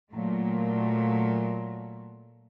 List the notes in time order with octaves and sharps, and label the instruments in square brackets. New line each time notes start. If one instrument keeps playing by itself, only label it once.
[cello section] A#2 F#3 A3